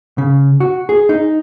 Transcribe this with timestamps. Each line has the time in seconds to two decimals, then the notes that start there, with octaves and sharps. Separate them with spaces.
0.18 C#3
0.60 F#4
0.89 G#4
1.09 D#4